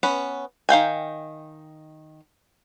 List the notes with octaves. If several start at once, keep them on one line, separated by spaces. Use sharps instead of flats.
B3 C#4 B4
D#3 F5 G5 G#5